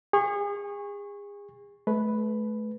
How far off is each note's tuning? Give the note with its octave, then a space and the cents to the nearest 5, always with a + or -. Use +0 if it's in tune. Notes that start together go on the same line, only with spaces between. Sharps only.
G#4 -35 C#6 -15
A3 -35 B4 +0